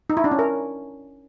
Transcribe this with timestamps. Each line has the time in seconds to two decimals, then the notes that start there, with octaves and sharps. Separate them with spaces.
0.10 D#4
0.17 E4
0.24 D4
0.31 C#4
0.39 A#4